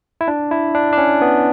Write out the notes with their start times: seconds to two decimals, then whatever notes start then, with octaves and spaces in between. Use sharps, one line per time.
0.21 E4
0.28 D4
0.51 E4
0.75 D4
0.93 D4
0.98 C#4
1.21 B3